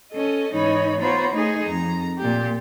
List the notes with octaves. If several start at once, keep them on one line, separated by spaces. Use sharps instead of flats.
C#4 A4 D#5
G#2 E3 D#4 C#5 B5
B3 F4 C5 C#5 A#5 B5
A3 D#4 G#4
F2 A#5
A#2 G4